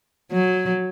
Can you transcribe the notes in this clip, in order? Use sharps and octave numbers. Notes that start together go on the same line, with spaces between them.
F#3